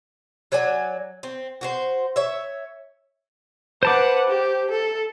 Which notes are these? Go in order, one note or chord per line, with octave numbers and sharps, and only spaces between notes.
F#3 C#5 D5 G#5
C4
F#4 G4 C5
C#5 E5
B4 C5 F#5 A5 D6
G4
A4